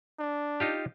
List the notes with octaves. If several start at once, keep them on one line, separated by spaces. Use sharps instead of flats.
D4
D#4 F4 G4